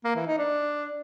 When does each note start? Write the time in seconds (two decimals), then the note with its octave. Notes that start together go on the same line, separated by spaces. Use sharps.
0.04 A#3
0.15 E3
0.27 D#4
0.38 D4